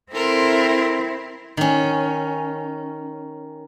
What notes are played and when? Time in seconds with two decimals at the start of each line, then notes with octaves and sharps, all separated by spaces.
0.12 C4 E4 A4 A#4 C6
1.57 D#3 C#4